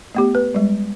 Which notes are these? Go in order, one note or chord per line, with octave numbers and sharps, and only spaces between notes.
A3 B3 G4
B4
G3 G#3